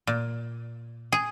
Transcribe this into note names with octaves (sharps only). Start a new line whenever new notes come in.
A#2
G#4